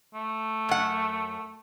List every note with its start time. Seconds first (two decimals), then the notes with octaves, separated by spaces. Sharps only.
0.14 A3
0.69 F#2 F#5